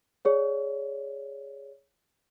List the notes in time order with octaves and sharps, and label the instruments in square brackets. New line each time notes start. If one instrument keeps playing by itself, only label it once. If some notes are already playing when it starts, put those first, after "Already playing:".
[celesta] G#4 C#5 D5